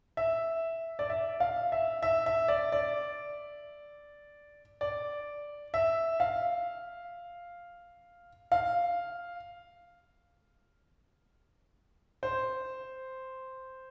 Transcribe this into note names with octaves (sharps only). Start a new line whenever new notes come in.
E5
D5
E5
F5
E5
E5
E5
D5
D5
D5
E5
F5
F5
C5